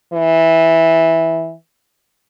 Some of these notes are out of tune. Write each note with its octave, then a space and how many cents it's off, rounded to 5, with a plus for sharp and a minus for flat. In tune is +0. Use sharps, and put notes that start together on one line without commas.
E3 -10